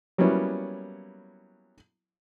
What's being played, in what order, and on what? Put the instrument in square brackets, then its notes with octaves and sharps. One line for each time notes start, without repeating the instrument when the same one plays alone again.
[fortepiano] F#3 G3 A#3 B3 C#4 E4